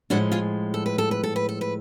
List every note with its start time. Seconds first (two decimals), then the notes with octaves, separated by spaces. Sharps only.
0.10 A2 F3 G#3 D4 F#4
0.32 F4 G#4
0.74 A4
0.86 B4
0.98 A4
1.11 B4
1.23 A4
1.36 B4
1.49 A4
1.61 B4